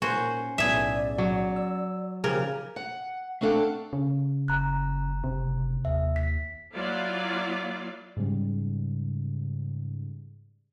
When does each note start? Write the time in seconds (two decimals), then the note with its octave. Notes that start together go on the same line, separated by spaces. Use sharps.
0.02 A#2 C#4 F#4 A#4 C5
0.58 B1 A2 B3 G#4 D5 E5
1.18 F#3
1.56 E6
2.24 C#3 F3 G4 A#4 G#5
2.76 F#5
3.41 A3 C4 D4 A4 F5 F#5
3.93 C#3
4.48 F#1 A#5 F#6
5.24 F#1 C3
5.85 D#2 E5
6.16 B6
6.74 F#3 A#3 E4 F4 D5 F5
8.17 G#2 C#3 G3